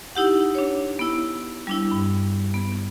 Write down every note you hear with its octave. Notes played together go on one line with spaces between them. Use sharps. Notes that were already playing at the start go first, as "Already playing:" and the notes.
D#4 E4 G4 F#5
D4 C#5
B3 E4
G3 D4 E4
G2
B3